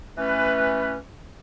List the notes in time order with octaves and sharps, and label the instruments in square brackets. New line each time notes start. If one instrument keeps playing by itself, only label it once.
[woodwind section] E3 A3 C#4 B4